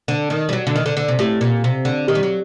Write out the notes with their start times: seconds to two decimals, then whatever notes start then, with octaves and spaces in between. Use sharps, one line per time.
0.08 D3
0.30 D#3
0.49 G3
0.53 F#3
0.67 D3
0.76 D#3
0.86 D3
0.97 D3
1.08 C3
1.19 A2 G4
1.41 A#2
1.64 C3
1.85 D3
2.08 D#3 G4
2.15 G3
2.23 F#3